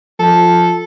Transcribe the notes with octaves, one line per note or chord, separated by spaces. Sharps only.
F3 A4